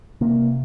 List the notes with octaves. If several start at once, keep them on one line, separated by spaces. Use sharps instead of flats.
C3 A#3